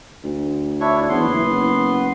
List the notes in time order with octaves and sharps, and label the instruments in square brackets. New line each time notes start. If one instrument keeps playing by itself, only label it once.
[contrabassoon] D2
[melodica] D4 E4 C#5
[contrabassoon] E2 [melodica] B3 C6
[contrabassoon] F#1